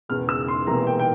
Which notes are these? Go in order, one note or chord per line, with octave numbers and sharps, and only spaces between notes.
E1 E2 C#3 F6
E6
C6
E1 E2 C3 E3 A#3 A#5
G5
G5